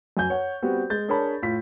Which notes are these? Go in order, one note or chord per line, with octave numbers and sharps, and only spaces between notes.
F#2 G#5 G6
C#5 F#5
G3 B3 C4 F#4
G#3 G6 A6
D4 G#4 A#4 C#5 A5 B5
A2 F4 B6